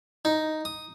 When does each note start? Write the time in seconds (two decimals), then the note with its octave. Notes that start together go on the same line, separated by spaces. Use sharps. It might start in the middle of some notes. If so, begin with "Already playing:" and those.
0.25 D#4
0.65 D#6